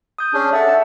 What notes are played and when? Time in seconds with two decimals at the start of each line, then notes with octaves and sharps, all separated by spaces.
0.19 D#6 G6
0.34 C#4 D4 G#4
0.53 A4 E5 F#5
0.69 A5